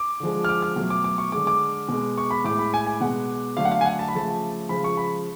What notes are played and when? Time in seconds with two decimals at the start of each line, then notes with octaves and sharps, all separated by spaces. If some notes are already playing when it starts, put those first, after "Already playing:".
Already playing: D6
0.20 D3 F3 G#3
0.44 F6
0.49 D6
0.62 F6
0.76 B2 F#3 A3
0.90 D6
1.04 D6
1.18 C#6
1.32 D3 G#3 D6
1.47 D6
1.89 B2 G#3
2.18 C#6
2.31 B5
2.44 A2 G#3 D6
2.59 B5
2.74 G#5
2.86 G#5
3.01 B2 G#3 F#5
3.57 D3 F#3 A3 F5
3.65 F#5
3.72 F5
3.81 G#5
3.86 F#5
3.99 A5
4.08 B5
4.14 C#3 F3 A3 A5
4.69 C#3 F3 G#3 B5
4.84 C#6
4.97 B5